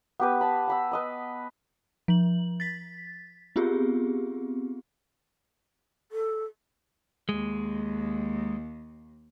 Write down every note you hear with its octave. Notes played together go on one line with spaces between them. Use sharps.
B3 G4 B4
A5 B5
F#5 B5 E6
B4 D#5 B5
F3 F#7
A6 B6
B3 C4 F4 G4 G#4
A4
D#2 G#3